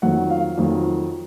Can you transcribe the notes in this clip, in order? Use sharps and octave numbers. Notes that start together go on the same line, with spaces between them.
F2 D#3 F#3 F#5
F5
F2 D#3 F#3